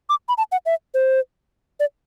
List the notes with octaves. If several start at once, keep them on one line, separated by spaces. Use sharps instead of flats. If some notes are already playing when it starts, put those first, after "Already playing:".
D6
B5
A5
F#5
E5
C5
D5